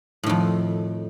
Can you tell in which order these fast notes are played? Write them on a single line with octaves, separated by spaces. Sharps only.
A2 D#3 F2